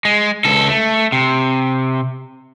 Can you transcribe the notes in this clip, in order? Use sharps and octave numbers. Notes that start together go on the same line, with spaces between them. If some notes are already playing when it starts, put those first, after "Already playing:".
G#3
C#2 A4
A3
C3